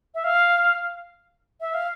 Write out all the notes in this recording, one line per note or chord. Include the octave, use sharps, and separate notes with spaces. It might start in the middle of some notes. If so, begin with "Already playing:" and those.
E5
F5
E5
F5